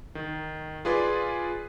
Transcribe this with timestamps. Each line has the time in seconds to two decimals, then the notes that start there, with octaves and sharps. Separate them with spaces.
0.15 D#3
0.85 F4 G#4 B4 D5 C6